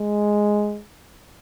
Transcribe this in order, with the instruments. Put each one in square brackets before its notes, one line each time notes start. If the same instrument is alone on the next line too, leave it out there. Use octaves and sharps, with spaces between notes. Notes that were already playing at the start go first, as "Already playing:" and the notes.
Already playing: [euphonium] G#3